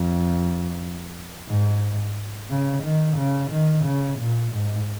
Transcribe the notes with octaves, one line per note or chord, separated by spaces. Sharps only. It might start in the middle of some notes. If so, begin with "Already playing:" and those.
Already playing: F2
G#2
C#3
D#3
C#3
D#3
C#3
A#2
G#2